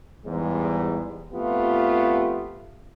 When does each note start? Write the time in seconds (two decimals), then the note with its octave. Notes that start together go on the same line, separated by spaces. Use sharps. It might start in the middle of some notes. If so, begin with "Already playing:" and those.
0.24 E2 G#2 G3 G#3
1.32 F2 A3 B3 F4 G4